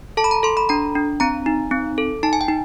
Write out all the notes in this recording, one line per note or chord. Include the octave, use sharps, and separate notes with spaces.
A4 A5
B5
A#5
A4 C6
B5
D4 A#5
D4
C4 A#5
D#4
C4
A4
D#4 A5
G#5
G5
D#4